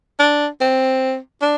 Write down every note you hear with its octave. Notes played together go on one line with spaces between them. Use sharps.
D4
C4
D4